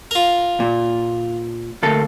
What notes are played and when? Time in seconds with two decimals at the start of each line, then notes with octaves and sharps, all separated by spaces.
0.11 F4 A#4
0.60 A#2
1.83 D2 A#3 A4